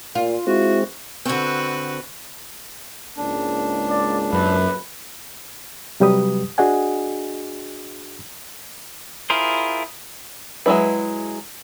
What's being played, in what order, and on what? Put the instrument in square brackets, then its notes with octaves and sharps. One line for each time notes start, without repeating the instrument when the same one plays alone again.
[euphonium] A#2 [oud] F4
[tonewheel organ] G#3 C4 [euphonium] E4 [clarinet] F#4
[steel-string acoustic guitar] D3 C4 [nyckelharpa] F#4 B4
[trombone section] C#2 G#2 A#3 [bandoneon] D4
[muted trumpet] D5
[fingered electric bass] F#2 [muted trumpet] B4
[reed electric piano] C3 F#3 G3 G4 B4 D#6
D4 F#4 G#4 D#5 F#5 G#5
[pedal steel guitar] E4 F4 G#4 A#4 C5
[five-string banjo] F#3 G#3 A3 E4 B4